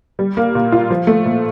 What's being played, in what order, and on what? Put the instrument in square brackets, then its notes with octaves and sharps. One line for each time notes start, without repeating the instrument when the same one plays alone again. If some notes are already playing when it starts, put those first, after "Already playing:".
[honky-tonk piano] G3
A#3
A#2
F4
F3
A3
A#2